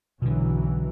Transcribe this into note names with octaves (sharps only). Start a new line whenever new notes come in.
B1 B2 D3 E3 F#3